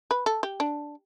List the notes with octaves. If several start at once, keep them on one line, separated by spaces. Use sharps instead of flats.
B4
A4
G4
D4